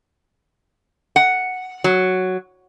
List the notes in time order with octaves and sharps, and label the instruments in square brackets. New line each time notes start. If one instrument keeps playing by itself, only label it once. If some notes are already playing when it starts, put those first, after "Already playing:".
[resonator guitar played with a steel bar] F#5
F#3